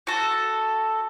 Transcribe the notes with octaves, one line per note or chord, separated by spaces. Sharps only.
F#4 A4